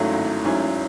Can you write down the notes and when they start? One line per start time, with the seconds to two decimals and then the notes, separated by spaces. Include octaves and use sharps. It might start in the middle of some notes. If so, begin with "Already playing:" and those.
Already playing: G#1 G#2 F#3 A3 C#4 E4
0.13 G#1
0.44 G#2 F#3 C#4 E4